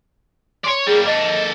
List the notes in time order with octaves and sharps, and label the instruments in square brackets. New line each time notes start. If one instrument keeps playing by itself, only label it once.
[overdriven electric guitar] C#5 D5 [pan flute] C6
[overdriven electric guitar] G3 A#3 [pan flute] G#4
[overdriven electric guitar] A#3 A4 [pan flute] D#5